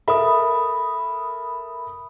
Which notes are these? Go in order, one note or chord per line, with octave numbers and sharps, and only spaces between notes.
A4 A#4 E5 B5 D#6